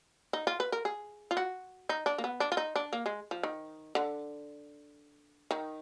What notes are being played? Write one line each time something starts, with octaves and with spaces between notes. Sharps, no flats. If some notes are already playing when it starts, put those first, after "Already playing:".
D#4
F4
B4
A#4
G#4
F4
F#4
D#4
D4
A#3
B3
D4
F4
D#4
D4
A#3
G#3
F3
D#3
D3
D#3